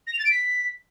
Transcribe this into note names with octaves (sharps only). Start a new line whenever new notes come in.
A#6
F7
A6
D7
B6